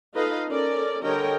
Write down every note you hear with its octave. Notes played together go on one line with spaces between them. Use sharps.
D#4 F4 A4 B4 D#5 F5
C#4 A4 A#4 D5
D3 G3 A#4 C#5 D#5 G5